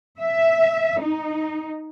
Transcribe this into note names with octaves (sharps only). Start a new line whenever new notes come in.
E5
D#4